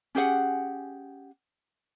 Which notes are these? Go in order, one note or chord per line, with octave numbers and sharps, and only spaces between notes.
C#4 G4 G#4 F#5